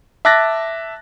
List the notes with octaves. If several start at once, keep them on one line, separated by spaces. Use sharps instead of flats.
E5 A5 D6 F#6 A6 A#6